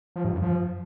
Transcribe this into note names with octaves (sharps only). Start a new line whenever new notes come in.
F3
G2
F#2
F3